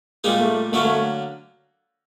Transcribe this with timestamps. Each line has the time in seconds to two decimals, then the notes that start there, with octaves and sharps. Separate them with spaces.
0.24 A#2 G3 G#3 A#3 D#4
0.40 A3
0.72 D3 F#3 A3 A#3 C#4
0.85 A3